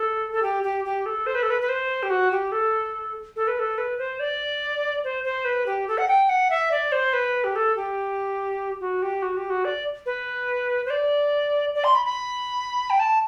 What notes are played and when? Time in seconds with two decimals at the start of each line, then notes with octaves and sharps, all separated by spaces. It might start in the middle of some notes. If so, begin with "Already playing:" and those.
Already playing: A4
0.32 A4
0.42 G4
0.63 G4
0.85 G4
1.06 A4
1.26 C5
1.35 B4
1.43 A4
1.50 B4
1.61 B4
1.69 C5
2.03 G4
2.10 F#4
2.31 G4
2.52 A4
3.36 A4
3.47 B4
3.59 A4
3.78 B4
3.98 C5
4.19 D5
5.04 C5
5.24 C5
5.45 B4
5.66 G4
5.88 A4
5.98 F#5
6.08 G5
6.29 F#5
6.50 E5
6.71 D5
6.92 C5
7.13 B4
7.44 G4
7.55 A4
7.76 G4
8.80 F#4
9.02 G4
9.22 F#4
9.37 G4
9.50 F#4
9.65 D5
10.06 B4
10.86 C5
10.90 D5
11.75 D5
11.84 C6
11.95 B5
12.05 B5
12.90 G5
12.99 A5